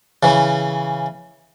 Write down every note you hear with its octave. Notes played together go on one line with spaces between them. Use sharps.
C#3 E3